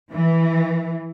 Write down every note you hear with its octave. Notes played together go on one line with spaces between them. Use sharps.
E3